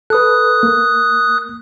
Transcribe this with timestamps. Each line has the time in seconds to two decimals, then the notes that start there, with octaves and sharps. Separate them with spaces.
0.10 A4 B4 D#6 F#6
0.63 A#3